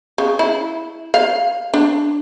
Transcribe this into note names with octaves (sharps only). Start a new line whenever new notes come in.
C#3
E4
F5
D4